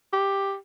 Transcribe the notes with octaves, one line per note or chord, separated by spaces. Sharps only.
G4